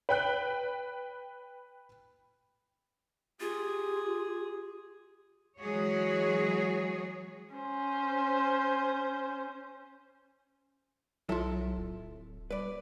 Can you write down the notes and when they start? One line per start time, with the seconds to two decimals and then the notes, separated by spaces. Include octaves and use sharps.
0.09 B4 G5 F#6
3.40 F4 G4 G#4
5.60 E3 F#3 G#3 F#4 G#4 C#5
7.55 C#4 C5
11.29 B1 F#3 E4 F4 A4 E5
11.77 D1
12.51 G3 B4 D5